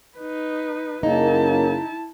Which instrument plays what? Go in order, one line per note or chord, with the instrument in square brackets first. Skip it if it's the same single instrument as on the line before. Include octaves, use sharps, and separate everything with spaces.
[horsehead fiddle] D#4 B4
[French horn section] F#2 C#3 A#3 [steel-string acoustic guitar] D#4 [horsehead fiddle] E4 A5